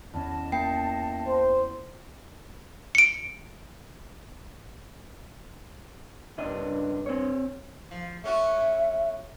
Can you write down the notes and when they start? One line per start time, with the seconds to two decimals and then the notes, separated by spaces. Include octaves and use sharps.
0.13 E2 C#4 D#5 A5
0.52 A#3 G5 C7
1.27 C5
2.95 C#7 D7
6.38 G2 C#3 D4 D#5
7.06 C4 C#5
7.91 F3
8.24 A3 C#4 F#4 E5